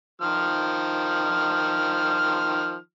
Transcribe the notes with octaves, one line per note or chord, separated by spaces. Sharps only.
D#3 F3 F6